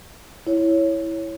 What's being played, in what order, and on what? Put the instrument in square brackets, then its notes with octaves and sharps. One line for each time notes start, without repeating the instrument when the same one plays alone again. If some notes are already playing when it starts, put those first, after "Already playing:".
[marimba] E4 C#5